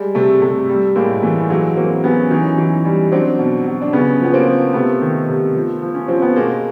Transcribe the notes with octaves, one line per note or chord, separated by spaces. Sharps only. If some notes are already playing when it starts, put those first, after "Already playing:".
Already playing: G3 G#3
C3 A3
C3 A3
G3
A2 G#3 A#3
E3 A3
F#3 G#3 A#3
F#3 A#3 C4
F#3 B3 C#4
E3 C#4 D#4
E3
G3
F#3 C4 D4
B2
F#3
D4
C#3 B3 C#4
F3 B3
A#3 C4
F3
C3 A3 B3
D#3
C3
F3
F3
C#4
F3 C4
B3
B2 G#3 A#3